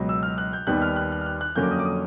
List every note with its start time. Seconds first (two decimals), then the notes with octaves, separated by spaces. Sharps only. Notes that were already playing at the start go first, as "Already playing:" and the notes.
Already playing: C#2 B2 F#3
0.09 E6
0.23 F6
0.38 F#6
0.53 G6
0.67 D#2 D#3 G3 B3 F#6
0.82 F6
0.96 F#6
1.12 F#6
1.21 F6
1.26 F#6
1.41 F#6
1.56 F2 D3 F#3 A#3 C#4 G6
1.63 D6
1.71 D#6
1.79 D6
1.85 D#6